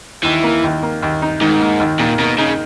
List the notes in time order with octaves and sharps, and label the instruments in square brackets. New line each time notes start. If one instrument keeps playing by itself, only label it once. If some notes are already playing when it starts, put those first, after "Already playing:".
[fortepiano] D#2 [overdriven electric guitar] E3
[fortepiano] A#3
D#2
A#3
D#2
D#4
[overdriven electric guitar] G#2 [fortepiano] D#3
[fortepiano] A#3
D#2
[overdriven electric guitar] A#2 [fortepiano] D#3
[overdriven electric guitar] B2 [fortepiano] A#3
[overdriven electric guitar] C#3 [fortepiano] D#4